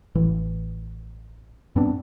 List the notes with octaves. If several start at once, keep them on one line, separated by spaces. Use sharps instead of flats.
A1 E3
G2 B3 C4 D4